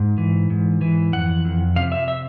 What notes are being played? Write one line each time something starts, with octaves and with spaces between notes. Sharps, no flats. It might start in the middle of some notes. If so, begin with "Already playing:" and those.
Already playing: G#2
E3
G#2
E3
F2 F#5
F2
C3 F5
E5
E5